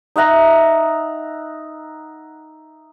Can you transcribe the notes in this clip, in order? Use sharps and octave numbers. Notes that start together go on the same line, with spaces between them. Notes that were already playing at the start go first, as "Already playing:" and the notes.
D#4 E5 F#5 A#5